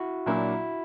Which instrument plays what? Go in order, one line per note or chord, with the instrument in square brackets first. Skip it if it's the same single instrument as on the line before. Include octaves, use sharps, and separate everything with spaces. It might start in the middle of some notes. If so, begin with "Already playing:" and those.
Already playing: [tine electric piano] E4 F#4
[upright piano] A#2 F#3 A#3 D4 [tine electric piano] E4